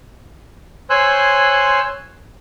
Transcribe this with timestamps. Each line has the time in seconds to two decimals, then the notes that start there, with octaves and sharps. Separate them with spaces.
0.90 C5 C#5 G#5 C6 E6 F#6